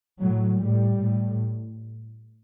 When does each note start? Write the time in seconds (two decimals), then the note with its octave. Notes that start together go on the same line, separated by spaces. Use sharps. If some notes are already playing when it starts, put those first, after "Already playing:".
0.20 A2 F#3
0.60 A2 G3
1.01 A2